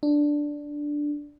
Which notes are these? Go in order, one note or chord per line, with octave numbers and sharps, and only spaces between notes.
D4